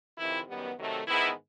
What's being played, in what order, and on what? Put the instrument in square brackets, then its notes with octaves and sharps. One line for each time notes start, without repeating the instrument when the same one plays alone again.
[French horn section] F2 C3 D#3 E3 E4
F#2 D#3 G3 B3
C3 D#3 F#3 A3
G#2 D#3 E3 G#3 B3 E4